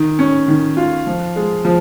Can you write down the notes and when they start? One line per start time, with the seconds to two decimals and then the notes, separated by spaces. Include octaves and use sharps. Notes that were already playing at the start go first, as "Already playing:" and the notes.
Already playing: D#3
0.19 C#4
0.48 D#3
0.77 F4
1.07 F3
1.36 G#3
1.65 F3